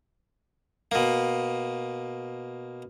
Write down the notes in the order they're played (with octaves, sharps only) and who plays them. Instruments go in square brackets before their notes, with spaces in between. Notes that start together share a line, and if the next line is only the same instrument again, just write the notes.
[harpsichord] B2 A#3